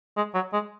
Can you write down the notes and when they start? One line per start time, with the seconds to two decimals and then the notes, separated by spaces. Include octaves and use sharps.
0.17 G#3
0.34 F#3
0.53 G#3